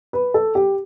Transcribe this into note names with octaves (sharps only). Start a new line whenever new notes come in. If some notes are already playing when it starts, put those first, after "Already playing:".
B4
A4
G4